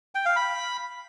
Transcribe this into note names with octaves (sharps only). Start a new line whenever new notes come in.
G5
F5
B5